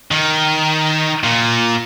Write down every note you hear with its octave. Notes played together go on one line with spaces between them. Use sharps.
D#3
A#2